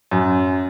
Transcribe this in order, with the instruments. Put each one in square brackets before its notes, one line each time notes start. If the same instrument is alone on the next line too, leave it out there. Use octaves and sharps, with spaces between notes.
[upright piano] F#2